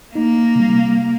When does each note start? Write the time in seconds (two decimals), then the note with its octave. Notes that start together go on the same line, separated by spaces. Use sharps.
0.15 A#3 D#4
0.55 C3 G3